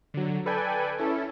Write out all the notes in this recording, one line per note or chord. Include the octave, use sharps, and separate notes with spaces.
D3 F#3
A4 B4 D5 G5 G#5
C#4 E4 A4